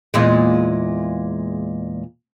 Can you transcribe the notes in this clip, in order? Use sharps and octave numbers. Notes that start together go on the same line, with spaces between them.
E2 A#2 G#3